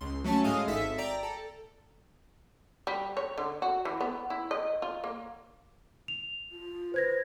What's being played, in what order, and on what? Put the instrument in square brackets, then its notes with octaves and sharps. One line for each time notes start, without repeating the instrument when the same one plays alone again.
[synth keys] C#2 C6
F#3 A3 C#4 A5 C#6
A2 G#3 D#5 F5 D#6
G#1 A4 E5 E6 B6
D5 G5 A#5
A4
[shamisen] G3
C#5
D3
F#4
E3
B3
E4
D#5
F4
A#3
[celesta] F7
[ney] F4
[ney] B4 [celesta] C5 G#6 A#6